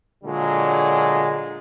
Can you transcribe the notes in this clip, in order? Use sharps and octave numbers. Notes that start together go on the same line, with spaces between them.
A#2 D3 F#3 G#3